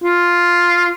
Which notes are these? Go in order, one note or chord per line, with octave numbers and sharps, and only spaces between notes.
F4